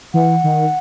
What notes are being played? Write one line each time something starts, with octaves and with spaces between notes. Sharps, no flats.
E3 F#5
D#3